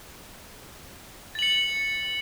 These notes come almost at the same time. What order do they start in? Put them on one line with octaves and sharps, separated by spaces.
A6 F#7 C#7